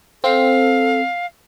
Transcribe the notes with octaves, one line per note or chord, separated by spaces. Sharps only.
C4 A4 F5